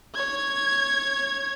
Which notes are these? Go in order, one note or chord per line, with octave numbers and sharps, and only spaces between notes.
C#5 G#6